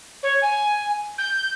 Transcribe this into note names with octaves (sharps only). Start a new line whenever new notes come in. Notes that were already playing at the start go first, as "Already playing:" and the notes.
C#5
G#5
G6